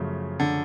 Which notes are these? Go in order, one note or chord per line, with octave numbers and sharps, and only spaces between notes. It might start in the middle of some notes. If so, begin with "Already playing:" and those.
Already playing: F#2 C#3 F3 A3
D3